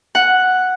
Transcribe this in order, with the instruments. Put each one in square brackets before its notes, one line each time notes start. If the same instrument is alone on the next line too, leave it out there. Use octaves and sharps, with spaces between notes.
[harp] F#5